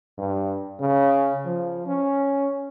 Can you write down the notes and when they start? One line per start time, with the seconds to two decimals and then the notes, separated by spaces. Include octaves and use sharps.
0.18 G2
0.80 C#3
1.45 F3
1.86 C#4